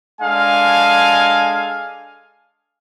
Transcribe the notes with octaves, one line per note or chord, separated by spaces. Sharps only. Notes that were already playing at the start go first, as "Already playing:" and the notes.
G#3 D4 A4 F5 G#5